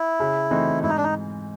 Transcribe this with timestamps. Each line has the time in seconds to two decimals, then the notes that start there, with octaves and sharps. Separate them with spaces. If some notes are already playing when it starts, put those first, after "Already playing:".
Already playing: E4
0.20 C#3
0.51 E3 A3 C4 D#4
0.83 G#2 E4
0.89 D#4
0.97 D4
1.04 D#4